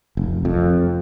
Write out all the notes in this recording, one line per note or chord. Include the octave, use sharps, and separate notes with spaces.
F1
F2